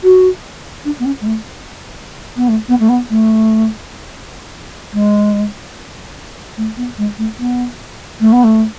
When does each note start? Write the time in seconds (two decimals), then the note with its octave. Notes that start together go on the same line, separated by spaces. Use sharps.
0.03 F#4
0.84 D4
0.99 B3
1.05 C#4
1.21 G#3
1.26 A3
2.36 B3
2.48 A3
2.68 B3
2.80 A3
2.89 B3
3.10 A3
4.93 G#3
6.57 A3
6.77 B3
6.98 G#3
7.18 A3
7.39 B3
8.20 A3
8.32 B3
8.44 A3